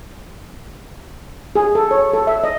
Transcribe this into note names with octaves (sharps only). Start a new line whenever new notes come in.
G#4
A4
C#5
A4
E5
D#5